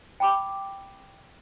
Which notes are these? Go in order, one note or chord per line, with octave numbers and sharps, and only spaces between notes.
G5 B5 D6